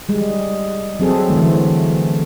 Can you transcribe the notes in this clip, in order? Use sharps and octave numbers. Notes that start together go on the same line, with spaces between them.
G3 G#3
F#3 C4 G#4 A4
D3 E3 A3